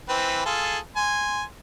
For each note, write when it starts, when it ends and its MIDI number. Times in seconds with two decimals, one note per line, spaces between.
0.09 0.44 52
0.09 0.44 60
0.09 0.44 71
0.45 0.78 65
0.45 0.78 68
0.45 0.78 69
0.96 1.43 80
0.96 1.43 84